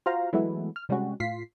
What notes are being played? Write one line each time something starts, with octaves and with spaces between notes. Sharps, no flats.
F4 F#4 C5 F5 A#5
E3 F#3 G#3 A3 B3 E4
F6
C3 G3 G#3 C#4 F#4
A2 F4 B6 C7